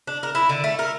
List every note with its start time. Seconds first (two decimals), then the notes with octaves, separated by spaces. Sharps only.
0.07 D4
0.23 A#4
0.35 E4
0.49 D3
0.64 A3
0.79 A#4